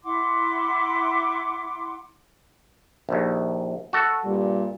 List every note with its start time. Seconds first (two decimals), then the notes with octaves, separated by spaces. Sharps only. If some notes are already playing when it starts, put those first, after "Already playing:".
0.04 E4 F#5 C6 D6
3.09 A#1 D#2
3.93 F#4 A4
4.24 G2 A#2 G3